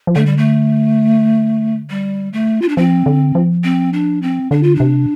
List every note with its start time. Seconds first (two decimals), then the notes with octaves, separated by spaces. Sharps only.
0.07 F3
0.16 D3 A3
0.26 G3
0.37 A3
1.90 G3
2.33 A3
2.62 F4
2.69 D4
2.77 F3 C4
3.06 D3
3.35 F3
3.64 C4
3.93 D4
4.22 C4
4.51 D3 D4
4.63 F4
4.76 C3 D4